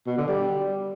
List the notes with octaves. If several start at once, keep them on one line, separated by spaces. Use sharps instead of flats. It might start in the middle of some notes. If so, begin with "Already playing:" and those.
B2
D3
G3